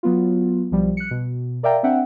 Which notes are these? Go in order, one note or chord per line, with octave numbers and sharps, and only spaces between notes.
F#3 B3 F4
B1 F3 G3
F#6 C#7
B2
A#4 D5 E5 F5 G5 A#5
C4 D4 E5 F#5 G5